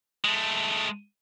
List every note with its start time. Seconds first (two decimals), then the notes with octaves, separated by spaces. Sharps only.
0.25 G#3 A3